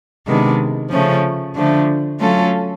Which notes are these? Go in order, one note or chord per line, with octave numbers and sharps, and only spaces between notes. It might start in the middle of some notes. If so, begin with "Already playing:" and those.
C3 D#3 G#3 B3 D4
C#3 F3 A3 C#4
D3 F3 A3
F#3 A3 C#4 F4 A4